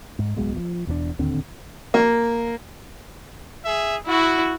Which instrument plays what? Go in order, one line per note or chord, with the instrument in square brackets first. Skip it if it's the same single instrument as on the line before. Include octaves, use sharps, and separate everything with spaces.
[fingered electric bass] G#2
D1 B1 B2 G#3
F3
E1 E2 A2 D4
D1 D#2 D3 C4
[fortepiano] A#3
[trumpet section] G#4 E5
[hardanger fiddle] E4 [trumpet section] F#4